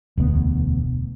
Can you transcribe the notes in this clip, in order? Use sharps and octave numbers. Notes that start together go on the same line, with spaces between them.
E1 D2 G#3 B3